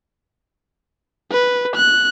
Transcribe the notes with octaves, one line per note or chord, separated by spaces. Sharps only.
B4
F#6